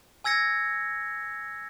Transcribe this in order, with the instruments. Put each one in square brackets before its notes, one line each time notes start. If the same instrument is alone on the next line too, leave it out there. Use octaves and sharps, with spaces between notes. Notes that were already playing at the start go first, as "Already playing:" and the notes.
[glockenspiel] G#5 E6 G#6 A#6 C#7